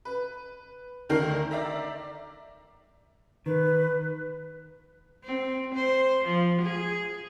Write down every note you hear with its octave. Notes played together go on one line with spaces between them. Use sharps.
B4
D2 D#3 D4 A#4 G6 C7
D5 E5 A#5
D#3 B4
C4
C5
F3
G#4